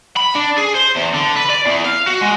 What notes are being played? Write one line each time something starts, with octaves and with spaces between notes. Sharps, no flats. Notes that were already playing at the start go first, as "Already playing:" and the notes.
B5
D4
G#4
C5
E2
D3
B4
D5
E2
F5
F#4
G#3